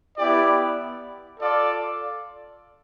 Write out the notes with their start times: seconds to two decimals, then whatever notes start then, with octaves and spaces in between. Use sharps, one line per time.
0.18 B3 E4 G4 D5
1.39 F4 A4 D5 F5